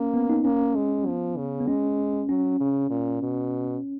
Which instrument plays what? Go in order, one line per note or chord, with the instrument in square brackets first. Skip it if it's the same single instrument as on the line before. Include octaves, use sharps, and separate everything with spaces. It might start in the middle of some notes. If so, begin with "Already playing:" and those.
Already playing: [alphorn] A#3 [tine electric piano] C#4
[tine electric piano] B3
D#4
[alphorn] A#3 [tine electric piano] C#4
[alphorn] G#3
[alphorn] F3 [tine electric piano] B3
[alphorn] C#3
[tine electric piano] B3
[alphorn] G#3 [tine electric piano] C#4
[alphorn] F#3 [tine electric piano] C#4
[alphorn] C#3
A#2
B2